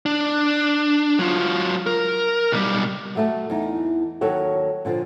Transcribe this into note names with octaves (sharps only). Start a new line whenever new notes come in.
D4
F#3 F4
A#4
B1 G3
F#3 A3 A5
E2 D#4
D#2 D#3 F#3 A4 C#5 F#5
A#2 D3 E3 F3